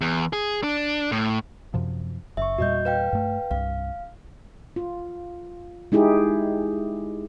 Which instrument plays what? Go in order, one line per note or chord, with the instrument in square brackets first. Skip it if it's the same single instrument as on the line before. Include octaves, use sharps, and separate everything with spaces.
[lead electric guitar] E2
G#4
D4
A2
[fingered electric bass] F#2 C3 F3
[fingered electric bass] F#1 [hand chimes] E5 C#6
[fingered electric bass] E2 A#2 G3 [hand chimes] F#4 D#5 G6
[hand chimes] B4 F5 G5
[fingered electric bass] G2 A3
[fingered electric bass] C2 G2 [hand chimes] F5
[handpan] F4
G#3 D#4 E4 G4 G#4